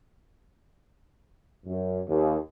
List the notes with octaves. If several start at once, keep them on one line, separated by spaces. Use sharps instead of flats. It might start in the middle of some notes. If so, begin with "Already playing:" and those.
F#2
D#2